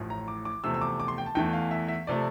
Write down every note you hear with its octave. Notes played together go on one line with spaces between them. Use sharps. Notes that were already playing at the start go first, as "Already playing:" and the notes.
Already playing: A1 A2 F3
A#5
D6
D6
E2 C3 F3 A3 E6
E6
D6
D6
C6
G5
A5
E2 E3 A3 G5
F5
E5
E5
C3 F3 A3 D5